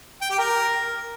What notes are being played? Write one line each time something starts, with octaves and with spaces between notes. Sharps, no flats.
G5
G4
A#4